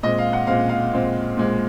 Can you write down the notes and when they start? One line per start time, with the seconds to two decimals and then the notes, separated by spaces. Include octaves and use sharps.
0.03 A#2 G#3 C4 D#5
0.18 F5
0.33 F#5
0.47 A#2 G#3 C4 F5
0.69 F5
0.93 A#2 G#3 C4
1.37 A#2 G#3 C4